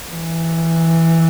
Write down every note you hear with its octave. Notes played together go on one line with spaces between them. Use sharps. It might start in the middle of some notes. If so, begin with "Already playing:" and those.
E3